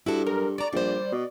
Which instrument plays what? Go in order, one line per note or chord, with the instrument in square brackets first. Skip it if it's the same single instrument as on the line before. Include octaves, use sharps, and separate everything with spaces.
[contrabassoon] G2 [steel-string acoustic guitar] E4 F#4 A4
[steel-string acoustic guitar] F#2 [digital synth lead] A#4
[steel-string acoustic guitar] F#4 A#5 [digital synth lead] D5
[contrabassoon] A#1 [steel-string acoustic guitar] G3 C5
[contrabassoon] B2